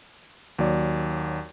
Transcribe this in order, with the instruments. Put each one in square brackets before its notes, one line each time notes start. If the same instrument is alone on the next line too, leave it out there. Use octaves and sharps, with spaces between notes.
[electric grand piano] D#2 F#3 D5